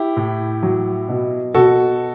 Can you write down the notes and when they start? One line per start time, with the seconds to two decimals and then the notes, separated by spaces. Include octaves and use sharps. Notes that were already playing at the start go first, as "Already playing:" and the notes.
Already playing: E4 G4
0.17 A2
0.63 F#3
1.09 B2
1.54 B2 F#4 A4